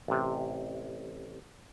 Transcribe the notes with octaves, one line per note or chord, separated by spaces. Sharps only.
A1 C3